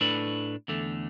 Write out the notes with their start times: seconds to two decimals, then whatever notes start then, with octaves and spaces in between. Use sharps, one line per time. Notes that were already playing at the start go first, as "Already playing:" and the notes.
0.01 A2 A3 D4 B4
0.68 E2 D3 A3